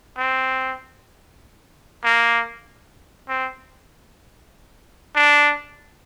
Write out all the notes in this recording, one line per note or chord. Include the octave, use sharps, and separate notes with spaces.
C4
A#3
C4
D4